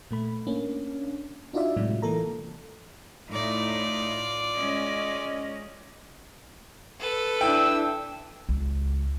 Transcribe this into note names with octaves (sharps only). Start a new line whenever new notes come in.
A#2 A3 B5
A#3 C#4 D4
D4 D#4 F4 F#4 D5 E5
A2 C3 F#3 G#3
E3 A#3 A4 A#5
A2 D#4 F4 D5
G#3 C#4 D#5
A4 B4
D4 E4 G5 E6
C#2